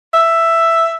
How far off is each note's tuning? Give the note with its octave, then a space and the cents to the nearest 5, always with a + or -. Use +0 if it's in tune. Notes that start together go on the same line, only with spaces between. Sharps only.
E5 +5